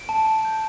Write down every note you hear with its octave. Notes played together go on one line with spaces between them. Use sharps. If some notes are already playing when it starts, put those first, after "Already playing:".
Already playing: D7
A5
A5
G6